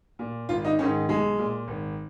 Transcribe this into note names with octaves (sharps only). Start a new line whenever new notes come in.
A#2
G#1 F4
D#4
G#2 D#3 C#4
B1 G#3
A#2
G#1